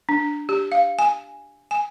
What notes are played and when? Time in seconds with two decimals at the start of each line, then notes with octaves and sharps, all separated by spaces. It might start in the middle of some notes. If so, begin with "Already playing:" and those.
0.09 D4
0.49 G4
0.72 F5
0.99 G#5
1.71 G#5